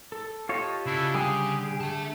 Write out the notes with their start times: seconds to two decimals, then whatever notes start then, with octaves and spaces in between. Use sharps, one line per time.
0.12 A4
0.49 F4 G4 C#5 D#5 A5
0.86 C#3 D4 E4 A4
1.15 D3 G3 G4 G#4 D5
1.81 E5 A5